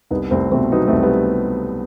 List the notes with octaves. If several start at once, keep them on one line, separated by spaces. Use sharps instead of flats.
C2 B3 D#4
C2 A3 C4
B2 A3 C4
F#3 B3 D#4
A3 C4
C2
G3 B3